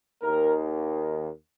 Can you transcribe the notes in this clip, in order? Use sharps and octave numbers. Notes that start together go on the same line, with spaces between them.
D#2 D#3 A#3 A#4